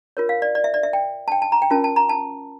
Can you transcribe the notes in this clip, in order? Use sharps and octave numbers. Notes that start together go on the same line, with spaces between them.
F4 A#4 C#5
F5
D5
D5
E5
D5
E5
G5
A5
G5
A5
A#5
G5
C#4 F4 A#4 A5
A5
A#5
A5